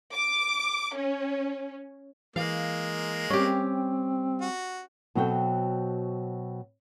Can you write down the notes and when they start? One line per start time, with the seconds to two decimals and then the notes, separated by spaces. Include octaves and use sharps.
0.14 D6
0.96 C#4
2.36 E3 G#3 A#3 F5
3.30 G3 C4 C#4 G4
4.41 F#4
5.15 B2 F#3 C4 F#4 A4 G5